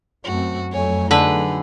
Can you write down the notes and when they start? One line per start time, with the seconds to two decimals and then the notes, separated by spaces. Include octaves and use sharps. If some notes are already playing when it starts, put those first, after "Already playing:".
0.24 F#2 A3 C4 F#4
0.72 F2 F#3 A3 C#5 G#5
1.11 D3 D#4 G#4 B4